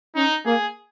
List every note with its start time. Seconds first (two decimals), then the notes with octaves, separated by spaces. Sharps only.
0.15 C#4 D#4
0.46 A#3 G#4